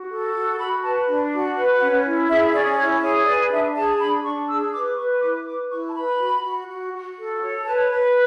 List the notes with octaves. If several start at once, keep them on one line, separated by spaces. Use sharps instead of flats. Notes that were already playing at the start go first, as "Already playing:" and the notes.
Already playing: F#4
A4
F#4
F#4 B5
B4 A5
D4
F#4
B4
C#4 F#5
E4
G#4 E5
C#4 D5
E4 C#5
G#4 C#5
B4 D5
D4 E5
G#4 A5
D4 B5
D4 C#6
G#4 E6
B4 D6
B4 C#6
E4 D6
B4 D6
E4 C#6
A5
B4 B5
F#4
F#4
F#4
F#4
A4
C#5
B4 A5
B4